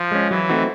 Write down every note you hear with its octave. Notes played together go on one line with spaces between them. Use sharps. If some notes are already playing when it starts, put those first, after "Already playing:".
Already playing: F3
G#3 C#4
E3 F#3
A3 C4 D#4 F#4